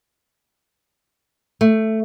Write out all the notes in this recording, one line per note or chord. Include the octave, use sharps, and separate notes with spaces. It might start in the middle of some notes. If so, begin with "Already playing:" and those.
A3